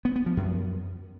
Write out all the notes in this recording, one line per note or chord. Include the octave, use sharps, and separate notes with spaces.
B3
B3
F3
F#2